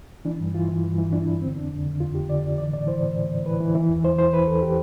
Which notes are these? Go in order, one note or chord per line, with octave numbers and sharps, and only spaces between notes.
E3 D4
G2
E3 F4
E3
G2
E3
E3 D4
E4
E3
D3 C4
F2 D4
D3
D3
F2 F4
F2 G4
D3 D5
D3
E3 D5
A2 D5
E3 C5
A2
A2
A2
E3 B4
E3
E3
E2
E3 C5
E3 C5
E3 B4
E2 A4
G4